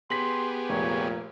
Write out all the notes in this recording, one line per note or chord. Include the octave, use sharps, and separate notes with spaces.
B3 G4 G#4 C6 B6 F#7
F1 A#2 C#5